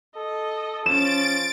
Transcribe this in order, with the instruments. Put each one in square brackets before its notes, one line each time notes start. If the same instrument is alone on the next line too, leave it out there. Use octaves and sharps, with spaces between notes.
[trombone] A4 [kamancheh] D#5
[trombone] F3 [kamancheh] C#4 [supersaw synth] A6 D7 [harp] E7